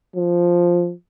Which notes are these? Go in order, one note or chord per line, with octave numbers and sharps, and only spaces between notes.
F3